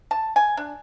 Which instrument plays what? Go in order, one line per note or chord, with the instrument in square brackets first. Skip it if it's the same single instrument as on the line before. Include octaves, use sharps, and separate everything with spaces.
[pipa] A5
G#5
D4